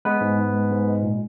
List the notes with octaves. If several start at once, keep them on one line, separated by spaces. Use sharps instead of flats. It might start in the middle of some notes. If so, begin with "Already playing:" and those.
G#3 B3 B4
G#2
G#2
G#3
G#2
G#3
A#2